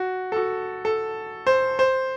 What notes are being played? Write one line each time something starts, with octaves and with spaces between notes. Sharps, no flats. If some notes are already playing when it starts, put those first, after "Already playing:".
Already playing: F#4
A4
F#4
A4
C5
C5